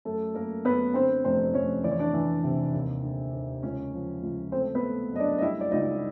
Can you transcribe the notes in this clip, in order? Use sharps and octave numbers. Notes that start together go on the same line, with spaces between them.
F#2 A3 A4
F#2 A#3 A#4
F#2 B3 B4
D3 C4 C5
F1 C4 C5
F1 C#4 C#5
E3 D5
C#5
D4 D5
E3
C3
D#2
D3
D#2
C#2 C#4 C#5
F3
C#2
A3 C4 C5
B3 B4
A3
F#2 D#5
D4 D5
D#5
G3 E4 E5
D5
C#2 D#4 D#5